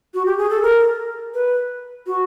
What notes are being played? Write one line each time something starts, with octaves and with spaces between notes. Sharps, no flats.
F#4
G4
G#4
A4
A#4
B4
F#4